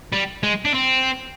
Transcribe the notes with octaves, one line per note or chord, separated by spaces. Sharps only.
G3
G#3
D4
C4